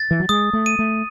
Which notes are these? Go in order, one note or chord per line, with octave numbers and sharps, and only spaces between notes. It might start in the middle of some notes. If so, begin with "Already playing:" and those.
Already playing: A6
E3
F#3
G#3 D#6
A3
D#7
A3